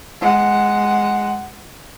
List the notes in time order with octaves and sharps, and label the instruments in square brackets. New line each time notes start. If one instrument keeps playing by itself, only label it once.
[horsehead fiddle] G#3 F#5